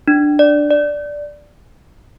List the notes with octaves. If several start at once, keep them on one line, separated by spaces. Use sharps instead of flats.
D4
D5
D5